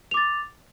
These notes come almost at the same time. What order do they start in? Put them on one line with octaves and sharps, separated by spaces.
F7 D6 A6